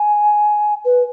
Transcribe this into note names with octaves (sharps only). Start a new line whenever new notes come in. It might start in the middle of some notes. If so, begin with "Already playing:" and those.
Already playing: G#5
B4